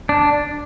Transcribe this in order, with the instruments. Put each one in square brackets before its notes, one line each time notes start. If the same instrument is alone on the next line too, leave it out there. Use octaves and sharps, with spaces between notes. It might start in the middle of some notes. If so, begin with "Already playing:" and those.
[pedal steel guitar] D4